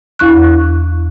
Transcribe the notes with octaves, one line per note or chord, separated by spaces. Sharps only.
E2 E4 C#6 F#6